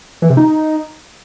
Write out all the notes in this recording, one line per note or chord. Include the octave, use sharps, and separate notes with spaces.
E3
C3
D#4